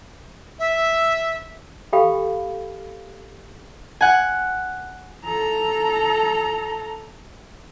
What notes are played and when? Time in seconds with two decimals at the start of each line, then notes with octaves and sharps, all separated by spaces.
0.59 E5
1.93 G4 A4 F5 G5 B5
4.01 F#5 G#5
5.26 A4 A#5